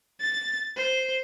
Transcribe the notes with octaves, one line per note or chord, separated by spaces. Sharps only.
A6
C5